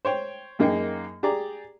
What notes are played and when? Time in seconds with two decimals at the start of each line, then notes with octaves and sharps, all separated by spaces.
0.05 C5 C#5 G5
0.59 F#2 A#3 D#4 G#4 G5
1.23 G4 G#4 D5 A#5